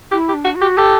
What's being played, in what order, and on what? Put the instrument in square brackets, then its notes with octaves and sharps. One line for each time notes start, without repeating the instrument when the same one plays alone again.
[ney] E4 [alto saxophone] G4
[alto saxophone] G4
[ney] D4
[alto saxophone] F#4
[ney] F#4
[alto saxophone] G4
[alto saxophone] G4 [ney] A4